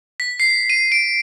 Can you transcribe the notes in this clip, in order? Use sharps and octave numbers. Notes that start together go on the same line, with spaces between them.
B6
C7
D#7
D7